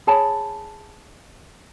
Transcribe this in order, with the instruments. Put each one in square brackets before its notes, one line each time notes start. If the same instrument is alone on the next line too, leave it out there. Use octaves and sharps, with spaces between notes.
[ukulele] G#4 C#5 A5 B5